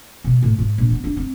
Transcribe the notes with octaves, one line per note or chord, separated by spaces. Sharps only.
B2
A2
G#2
A#1
B3
D4
C4